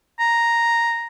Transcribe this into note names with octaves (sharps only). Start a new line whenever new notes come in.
A#5